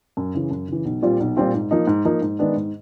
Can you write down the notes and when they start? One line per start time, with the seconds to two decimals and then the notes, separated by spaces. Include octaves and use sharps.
0.17 F#2
0.35 C#3 E3
0.51 F#2
0.68 C#3 E3
0.85 B1
1.02 A#2 G3 C4 F4
1.20 B1
1.37 A#2 G3 C4 F4
1.54 G#2
1.71 F3 A#3 D#4
1.87 G#2
2.05 F3 A#3 D#4
2.22 G#2
2.39 D#3 G#3 B3 D4
2.56 G#2